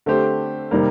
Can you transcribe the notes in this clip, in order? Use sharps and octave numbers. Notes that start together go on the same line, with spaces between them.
D3 A3 C4 G4 C5
C3 D#3 G3 A#3